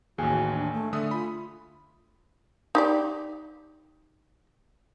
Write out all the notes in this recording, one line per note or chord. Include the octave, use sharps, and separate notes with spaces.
A1 D#2 F#4 G#4
D4
A3
D3 A3 E5 D#6
F4 B5
D#4 G4 D5